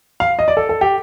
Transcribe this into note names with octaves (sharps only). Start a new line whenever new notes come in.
F5
D#5
D5
A4
A4
G4